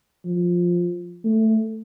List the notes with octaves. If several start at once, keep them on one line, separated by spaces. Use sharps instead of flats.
F3
A3